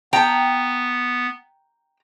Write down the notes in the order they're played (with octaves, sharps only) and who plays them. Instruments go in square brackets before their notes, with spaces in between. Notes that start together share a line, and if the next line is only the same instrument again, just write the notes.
[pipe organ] B3 [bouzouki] G5 [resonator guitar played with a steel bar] A#5